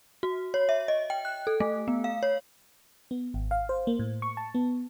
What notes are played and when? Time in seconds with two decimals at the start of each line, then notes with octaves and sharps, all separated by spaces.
0.23 F#4
0.54 C#5
0.69 E5
0.88 D#5
1.10 G5
1.25 F#6
1.47 A4
1.60 A3
1.88 B3
2.04 F5
2.23 C#5
3.11 B3
3.34 G#1
3.51 F5
3.69 C5
3.87 A#3
3.99 A2
4.22 C#6
4.37 A5
4.55 B3